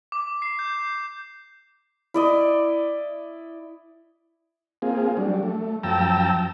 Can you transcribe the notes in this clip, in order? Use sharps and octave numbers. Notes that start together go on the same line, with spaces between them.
D6
C7
G6
E4 D5 D#5
A#3 C4 F4 G#4
F#3 G3 D4
A3
F#2 F3 G5 A5 A#5 E6